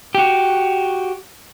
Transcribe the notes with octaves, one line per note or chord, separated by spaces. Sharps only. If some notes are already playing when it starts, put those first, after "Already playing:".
F#4 G4